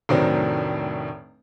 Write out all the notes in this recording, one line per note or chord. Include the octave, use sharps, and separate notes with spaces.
F1 A2 D#3 F#3 C4 D4